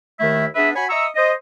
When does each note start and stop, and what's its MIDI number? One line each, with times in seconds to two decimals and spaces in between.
0.20 0.46 39
0.20 0.46 51
0.20 0.46 57
0.20 0.46 64
0.20 0.46 76
0.55 0.70 59
0.55 0.70 62
0.55 0.70 68
0.55 0.70 71
0.55 0.70 76
0.75 0.85 66
0.75 0.85 73
0.75 0.85 80
0.75 0.85 83
0.89 1.07 75
0.89 1.07 76
0.89 1.07 82
0.89 1.07 85
0.89 1.07 88
1.16 1.32 72
1.16 1.32 75